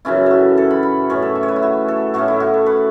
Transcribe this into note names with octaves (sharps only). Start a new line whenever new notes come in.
F#2 C#3 E3 C#4 E4
F#4 A4
A4
B5
B5
A2 E3 C#4 C#5
A4
E5
C#5
B4
E4
F#4
A4
A2 A3 C#4 F#4
E4
F#4
A4
B4